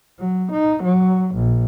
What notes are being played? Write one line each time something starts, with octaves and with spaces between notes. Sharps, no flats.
F#3
D#4
F#3
A#1